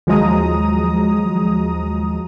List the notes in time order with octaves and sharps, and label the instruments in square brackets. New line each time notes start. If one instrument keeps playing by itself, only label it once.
[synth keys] D#2 F3 F#3 G#3 A#5 D#6